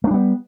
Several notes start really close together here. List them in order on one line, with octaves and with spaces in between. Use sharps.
A3 D4 G3 B3